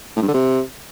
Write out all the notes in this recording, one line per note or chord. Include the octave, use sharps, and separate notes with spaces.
A2
G2
D3
C3